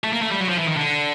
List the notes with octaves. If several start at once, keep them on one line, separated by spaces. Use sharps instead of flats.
A3
A#3
A3
G3
F#3
F3
E3
D#3
D3